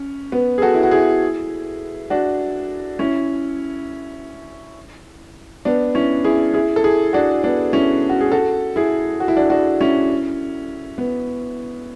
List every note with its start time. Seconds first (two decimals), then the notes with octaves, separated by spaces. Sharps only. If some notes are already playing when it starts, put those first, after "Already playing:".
Already playing: C#4
0.32 B3
0.58 G#4
0.62 F#4 A4
0.74 E4
0.83 F#4
0.91 E4 G#4
2.10 D4 F#4
2.99 C#4 E4
5.65 B3 D4
5.95 C#4 E4
6.24 E4 G#4
6.54 E4 G#4
6.76 A4
6.84 E4 G#4
7.13 D4 F#4
7.44 B3 D4
7.73 C#4 E4
8.09 F#4
8.21 G#4
8.31 F#4 A4
8.76 E4 G#4
9.20 F#4
9.28 E4
9.36 D4 F#4
9.50 D4 F#4
9.81 C#4 E4
10.98 B3